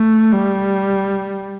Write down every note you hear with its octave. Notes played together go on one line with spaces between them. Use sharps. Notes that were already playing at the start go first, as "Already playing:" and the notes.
Already playing: A3
G3